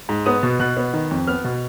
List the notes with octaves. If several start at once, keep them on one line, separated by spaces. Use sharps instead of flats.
G#2
B3 D#6
B2
B2 F#6
B3
D#3
F2
B3 F6
B2